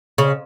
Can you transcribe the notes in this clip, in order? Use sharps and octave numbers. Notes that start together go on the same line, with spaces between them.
C#3